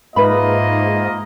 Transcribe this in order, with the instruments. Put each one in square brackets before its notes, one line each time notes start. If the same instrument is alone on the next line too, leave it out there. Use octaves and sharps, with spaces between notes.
[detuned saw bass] G#2 [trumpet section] A#3 F4 D#5 [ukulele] B4 E5 B5